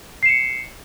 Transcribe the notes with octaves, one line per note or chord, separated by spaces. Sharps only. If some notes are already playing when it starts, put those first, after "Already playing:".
C7 C#7 E7